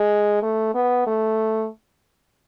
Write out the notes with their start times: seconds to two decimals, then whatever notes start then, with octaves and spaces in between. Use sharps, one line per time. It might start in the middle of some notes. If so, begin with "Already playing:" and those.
Already playing: G#3
0.42 A3
0.74 B3
1.07 A3